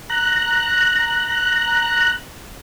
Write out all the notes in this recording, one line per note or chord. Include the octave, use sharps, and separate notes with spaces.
A#5 F#6